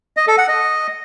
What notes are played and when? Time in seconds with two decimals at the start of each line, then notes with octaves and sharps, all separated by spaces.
0.17 D#5
0.27 A4
0.38 F#5
0.48 D#5